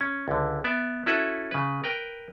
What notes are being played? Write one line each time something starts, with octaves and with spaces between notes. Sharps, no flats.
C#4
C#2 D3
B3 D5 E5
C#4 E4 F#4 A4 B4 E5
C#3 B4
A#4 B4 G5